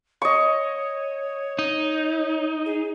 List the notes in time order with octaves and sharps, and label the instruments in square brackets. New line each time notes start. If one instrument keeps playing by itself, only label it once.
[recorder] C#5 [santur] D#5 C#6
[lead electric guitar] D#4
[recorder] G#4